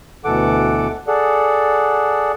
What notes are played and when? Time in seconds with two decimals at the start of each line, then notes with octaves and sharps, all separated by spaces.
0.25 D2 B2 E3 A4 F#5 D6
1.07 G#4 A4 D5 F#5